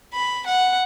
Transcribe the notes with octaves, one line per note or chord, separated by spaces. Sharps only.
B5
F#5